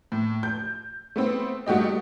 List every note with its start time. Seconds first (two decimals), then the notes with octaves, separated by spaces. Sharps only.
0.12 A2
0.43 G6
1.16 A3 B3 C4
1.66 G2 A3 F#4 G4 D#5